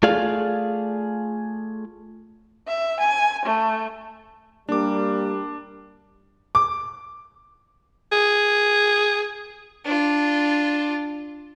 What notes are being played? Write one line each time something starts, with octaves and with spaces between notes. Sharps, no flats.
A3 F4 G#4 D5 F5
E5
G#5
A3
G3 A#3 D4 D6
D6
G#4
D4 F4